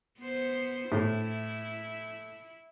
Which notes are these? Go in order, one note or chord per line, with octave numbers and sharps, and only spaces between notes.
B3 C5
A2 E4